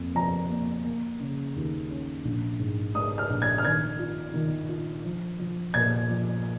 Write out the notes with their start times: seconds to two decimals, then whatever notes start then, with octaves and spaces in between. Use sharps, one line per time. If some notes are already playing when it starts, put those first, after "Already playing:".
Already playing: F2 A#3
0.15 F3 A#5
0.50 A#3
0.85 A#3
1.20 C#3
1.56 D#2
1.90 C#4
2.25 A#1
2.59 G#2
2.94 G#3 D#6
3.18 F6
3.30 A#1
3.42 G#6
3.58 F6
3.64 D#3 G#6
3.99 F4
4.34 D#3
4.69 F4
5.05 F3
5.39 F3
5.74 A#2 G#6
6.09 F3